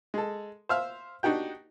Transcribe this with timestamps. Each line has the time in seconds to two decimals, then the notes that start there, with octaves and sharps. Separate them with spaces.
0.14 G#3 A4
0.69 C5 E5 F5
1.23 D4 D#4 F#4 G4 G5